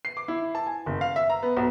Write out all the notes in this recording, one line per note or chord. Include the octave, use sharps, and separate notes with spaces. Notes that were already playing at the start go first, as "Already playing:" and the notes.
C7
D6
E4
A5
G#5
F#1
F5
E5
A#5
B3
B1